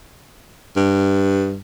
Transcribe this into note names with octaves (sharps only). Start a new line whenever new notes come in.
G2